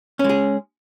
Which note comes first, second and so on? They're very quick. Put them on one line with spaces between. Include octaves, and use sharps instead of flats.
C#4 G#3 G#4